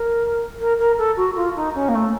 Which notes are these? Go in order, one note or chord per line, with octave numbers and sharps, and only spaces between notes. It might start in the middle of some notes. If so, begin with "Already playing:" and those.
Already playing: A#4
A#4
A#4
A4
F#4
F4
D#4
C#4
A#3
A3